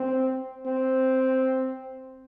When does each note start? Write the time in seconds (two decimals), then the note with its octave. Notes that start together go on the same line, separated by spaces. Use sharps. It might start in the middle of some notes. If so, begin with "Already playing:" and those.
Already playing: C4
0.66 C4